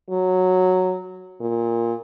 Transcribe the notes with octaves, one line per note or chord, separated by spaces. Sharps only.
F#3
A#2